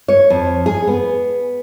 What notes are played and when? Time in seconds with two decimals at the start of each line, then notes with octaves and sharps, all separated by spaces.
0.08 C#5
0.30 F2
0.66 G#4
0.87 B3